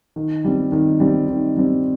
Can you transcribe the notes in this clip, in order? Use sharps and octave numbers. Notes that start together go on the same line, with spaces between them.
D#3
G3 C4
D#3
G3 C4
D#3
G3 C4